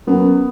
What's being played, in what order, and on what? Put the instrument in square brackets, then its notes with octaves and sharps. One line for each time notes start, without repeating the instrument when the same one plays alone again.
[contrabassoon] F#2 [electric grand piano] B3